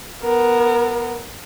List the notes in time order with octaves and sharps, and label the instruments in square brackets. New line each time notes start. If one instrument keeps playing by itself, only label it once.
[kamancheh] B3 A#4